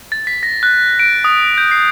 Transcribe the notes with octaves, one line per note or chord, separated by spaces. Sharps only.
A6
B6
A#6
F#6
D7
D#6
G6
C7